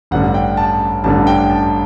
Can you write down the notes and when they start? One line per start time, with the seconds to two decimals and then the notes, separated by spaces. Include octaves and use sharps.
0.11 A1 G2 D3 F#5
0.34 G5
0.57 A5
1.04 A1 G2 D3 A5
1.27 G5
1.50 A5